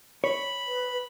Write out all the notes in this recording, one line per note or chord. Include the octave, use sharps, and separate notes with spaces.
C#5 B5
B4